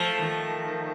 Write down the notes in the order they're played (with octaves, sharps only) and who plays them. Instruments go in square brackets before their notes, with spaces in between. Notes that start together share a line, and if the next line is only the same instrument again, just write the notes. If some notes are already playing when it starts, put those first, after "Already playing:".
Already playing: [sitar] F3 A3
[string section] D#3